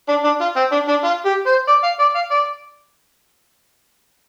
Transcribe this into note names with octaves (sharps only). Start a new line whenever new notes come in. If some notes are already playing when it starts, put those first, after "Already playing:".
D4
D4
F4
C4
D4
D4
F4
G4
C5
D5
F5
D5
F5
D5